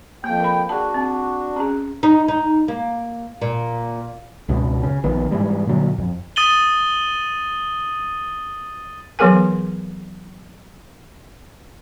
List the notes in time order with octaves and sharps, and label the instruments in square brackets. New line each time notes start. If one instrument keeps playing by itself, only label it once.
[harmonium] F2 G5 [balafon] A#3
[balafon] A#4 B5
[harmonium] D4 F#4 [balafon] G#4 A5
[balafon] C4
C#4 G#4
[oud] D#4
D#4
A#3
A#2
[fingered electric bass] C#2 F#2 B2
C#3
A#1 D#3 B3
G#2 E3 G3 G#3
A#2 D3 F#3
F2
[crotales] D#6 A6 D#7 F#7 G7
[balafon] E3 F#3 B3 G#4 A#4 G#5